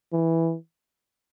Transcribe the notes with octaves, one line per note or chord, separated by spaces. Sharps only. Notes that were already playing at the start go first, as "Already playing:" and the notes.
E3